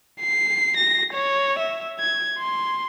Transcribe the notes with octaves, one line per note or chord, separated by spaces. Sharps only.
C7
A#6
C#5
E5
G#6
C6